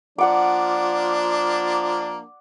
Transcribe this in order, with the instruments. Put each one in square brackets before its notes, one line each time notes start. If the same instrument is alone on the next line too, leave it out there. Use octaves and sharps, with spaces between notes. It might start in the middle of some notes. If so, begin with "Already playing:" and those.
[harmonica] F3 A#3 D4 [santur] D5 F#5 D6